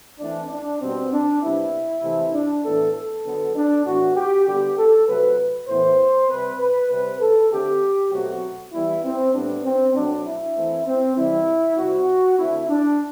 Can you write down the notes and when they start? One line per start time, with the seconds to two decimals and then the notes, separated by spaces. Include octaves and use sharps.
0.20 E3 A3 C4 D4
0.50 D4
0.80 B2 G3 B3 C4
1.11 D4
1.41 C3 G3 B3 E4
2.03 C3 E3 A3 C4
2.33 D4
2.64 A2 E3 B3 A4
2.93 A4
3.24 D3 F#3 B3
3.55 D4
3.85 A2 E3 B3 F#4
4.15 G4
4.46 D3 G3 B3 G4
4.77 A4
5.07 C3 F#3 A3 B4
5.67 A2 E3 B3 C5
6.29 C3 G3 C4 B4
6.59 B4
6.89 C3 G3 C4 B4
7.20 A4
7.51 D3 A3 C4 G4
8.11 B2 F#3 A3 C4 F#4
8.73 E3 G3 B3 E4
9.03 C4
9.33 A2 G3 B3 D4
9.63 C4
9.94 B2 F#3 A3 D4
10.25 E4
10.54 E3 A3 C4
10.85 C4
11.15 C3 E3 G3 E4
11.77 C3 G3 C4 F#4
12.38 D3 A3 C4 E4
12.68 D4